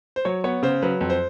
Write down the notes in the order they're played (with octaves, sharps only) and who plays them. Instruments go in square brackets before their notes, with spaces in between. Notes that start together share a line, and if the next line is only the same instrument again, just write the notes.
[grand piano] C5
F#3 C#5
B3 C#5
C#3 C5
F#3 B4
F2
C5